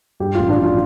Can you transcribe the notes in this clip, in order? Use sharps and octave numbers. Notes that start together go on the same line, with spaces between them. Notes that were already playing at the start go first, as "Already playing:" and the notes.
G2 G4
A1 F4
D4
F3 F4